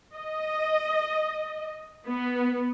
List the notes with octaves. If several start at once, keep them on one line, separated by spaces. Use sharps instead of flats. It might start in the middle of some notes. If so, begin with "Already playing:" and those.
D#5
B3